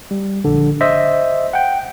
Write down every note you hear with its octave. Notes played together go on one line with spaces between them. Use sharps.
G3
A#1 D3
C5 D#5 E5
F#5 G5